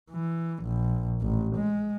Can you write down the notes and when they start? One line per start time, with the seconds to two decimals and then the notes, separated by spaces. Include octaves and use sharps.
0.11 E3
0.63 A#1
1.21 A1
1.56 G#3